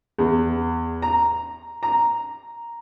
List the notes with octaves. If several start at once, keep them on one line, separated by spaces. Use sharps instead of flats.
E2
A#5
A#5